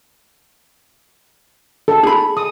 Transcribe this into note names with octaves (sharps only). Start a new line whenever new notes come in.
A4
G#4 B5
D#6